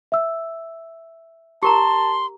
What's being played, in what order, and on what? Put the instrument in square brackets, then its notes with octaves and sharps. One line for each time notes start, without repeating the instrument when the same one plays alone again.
[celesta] E5 E6
[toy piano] G4 A#4 A#5 [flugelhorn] A5 [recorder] C6